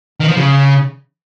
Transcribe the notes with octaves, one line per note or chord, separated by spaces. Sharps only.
D#3
F3
C#3